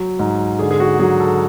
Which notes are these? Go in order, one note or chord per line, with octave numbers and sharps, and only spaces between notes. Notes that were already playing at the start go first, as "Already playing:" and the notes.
Already playing: F#3
G#2
D3 G#4
G#4
F#4
F#3 G#4
A4